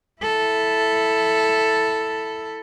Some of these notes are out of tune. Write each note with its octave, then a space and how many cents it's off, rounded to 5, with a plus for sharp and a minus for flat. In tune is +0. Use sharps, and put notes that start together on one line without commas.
E4 +0 A4 +0